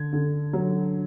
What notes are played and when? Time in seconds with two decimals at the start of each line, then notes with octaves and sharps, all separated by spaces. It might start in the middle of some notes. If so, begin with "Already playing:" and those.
Already playing: D3 G#6
0.13 D3
0.53 F#3